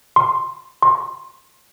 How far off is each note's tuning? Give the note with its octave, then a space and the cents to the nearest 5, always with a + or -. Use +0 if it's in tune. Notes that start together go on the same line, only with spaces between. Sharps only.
C6 +10
C6 +30